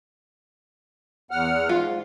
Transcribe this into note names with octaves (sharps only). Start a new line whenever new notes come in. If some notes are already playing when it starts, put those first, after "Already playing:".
E2 F#5 F6
G#2 F4